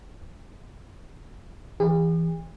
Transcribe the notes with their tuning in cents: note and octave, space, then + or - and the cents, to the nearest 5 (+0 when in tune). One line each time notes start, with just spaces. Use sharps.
E3 +0 G#4 -45